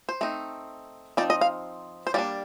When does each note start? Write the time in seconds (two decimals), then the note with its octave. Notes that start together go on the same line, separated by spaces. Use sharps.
0.09 C5
0.21 A3 C4 D#4
1.17 F3 C4 D#4 D5
1.30 D#5
1.41 F5
2.07 C5
2.14 G3 A#3 D4 D5